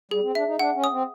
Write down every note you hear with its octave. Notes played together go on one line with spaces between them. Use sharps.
G3 G#4
C4
D4 E5
D#4
D4 F#5
C#4
D#6
C4